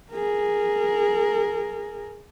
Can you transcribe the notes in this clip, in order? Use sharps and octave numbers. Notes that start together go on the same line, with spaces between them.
G#4 A#4